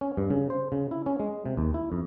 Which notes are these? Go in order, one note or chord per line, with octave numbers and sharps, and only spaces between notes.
C#4
G2
C#3
C5
C#3
E4
C#4
G#3
C3
D#2
E4
F2